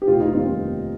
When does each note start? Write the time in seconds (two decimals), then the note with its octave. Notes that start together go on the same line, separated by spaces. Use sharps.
0.02 G4
0.07 F1 F4
0.20 D#4
0.33 D#2 D#3 G3 C4 F4